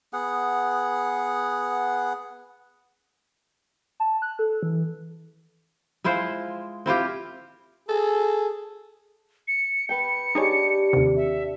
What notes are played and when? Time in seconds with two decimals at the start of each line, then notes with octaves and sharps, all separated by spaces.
0.13 B3 G#4 F#5
4.00 A5
4.22 F#6
4.39 A4
4.63 E3
6.04 G#3 E4 F4 C5
6.86 C4 E4 F4 G4
7.88 G#4 A4
9.48 C#7
9.89 B4 G5 C#7
10.35 D4 D#4 G4 G#4 C#5
10.93 D#2 C3
11.16 E5